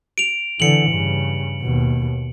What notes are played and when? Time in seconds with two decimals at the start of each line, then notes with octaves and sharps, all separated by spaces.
0.18 D7 F7
0.60 D3 E3 C#7 F#7
0.91 G2 C#3
1.61 D#2 B2